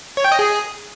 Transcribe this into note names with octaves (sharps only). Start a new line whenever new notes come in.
C#5
G5
D#5
G#4